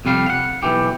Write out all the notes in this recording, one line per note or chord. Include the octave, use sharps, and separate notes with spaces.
F2 C3 G3 F5
F5 F#5
B1 E3 G4